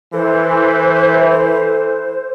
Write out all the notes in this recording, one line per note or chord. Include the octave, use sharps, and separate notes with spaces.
E3 A4 C5